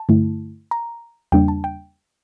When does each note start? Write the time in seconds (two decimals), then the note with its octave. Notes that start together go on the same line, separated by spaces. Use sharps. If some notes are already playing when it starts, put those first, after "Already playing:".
Already playing: A5
0.09 G2 D3 A3 E4
0.71 A#5
1.32 E2 C#3 G3 A#3 D4 G5
1.48 A5
1.64 G5